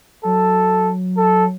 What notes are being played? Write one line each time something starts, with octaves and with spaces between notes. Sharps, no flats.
F#3 A4
A4